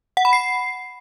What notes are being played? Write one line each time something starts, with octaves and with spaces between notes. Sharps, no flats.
F#5
B5
C7